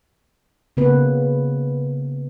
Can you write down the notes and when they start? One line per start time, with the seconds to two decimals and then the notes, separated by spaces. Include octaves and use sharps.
0.77 C#3 A#3 B3 B4